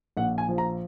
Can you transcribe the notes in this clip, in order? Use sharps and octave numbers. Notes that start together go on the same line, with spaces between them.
A#1 F#5
G#5
F3
A#5